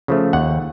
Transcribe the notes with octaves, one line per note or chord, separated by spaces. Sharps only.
C#3 F3 A3
D#2 F#5